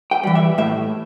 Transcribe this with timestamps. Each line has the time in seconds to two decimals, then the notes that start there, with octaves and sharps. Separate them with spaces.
0.11 G5
0.23 E3 G3
0.35 E5
0.58 A2 E5